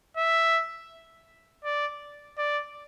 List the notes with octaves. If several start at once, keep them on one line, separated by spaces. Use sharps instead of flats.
E5
D5
D5